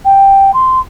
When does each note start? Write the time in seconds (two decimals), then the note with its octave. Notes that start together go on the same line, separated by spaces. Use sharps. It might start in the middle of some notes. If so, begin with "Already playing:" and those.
0.05 G5
0.54 C6